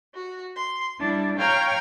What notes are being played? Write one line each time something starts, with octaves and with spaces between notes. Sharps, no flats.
F#4
C6
G3 D4 E4
C#5 F5 G5 A#5 F6 G#6